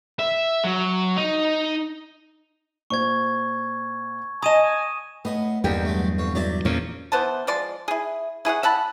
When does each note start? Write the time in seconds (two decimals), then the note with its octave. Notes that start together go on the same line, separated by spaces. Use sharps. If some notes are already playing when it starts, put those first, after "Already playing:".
0.19 E5
0.64 F#3
1.16 D#4
2.90 A#2 C5 C#6 G#6
4.42 D#5 G#5 A#5 D#6 D#7 E7
5.25 A2 B3 D#5 G#5
5.64 E2 G2 D3 A#3 D#4 G4 G5
5.85 F#3 G#3 A3
6.18 F2 B2 C#5
6.35 F#3 G4 D5 E5 B5
6.65 E2 A#2 F3 A#3 C#4
7.12 E3 B3 C5 A5
7.47 F3 G#3 D5 C6
7.88 E4 G#4
8.45 E4 G#4 C#5 F#5
8.63 E5 F#5 A5 B5